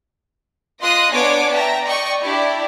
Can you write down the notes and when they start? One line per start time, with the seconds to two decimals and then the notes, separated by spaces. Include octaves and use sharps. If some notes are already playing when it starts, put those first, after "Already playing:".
0.82 F4 D#5 C6 D#6 F#6
1.11 B3 D4 C#5 D5 G#5 D6
1.52 E5 G5 A5 A#5
1.84 D5 D#5 G5 C#6
2.23 D4 E4 G4 D5